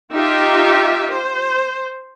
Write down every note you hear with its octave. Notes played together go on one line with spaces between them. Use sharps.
D#4 F4 G4 E5
C5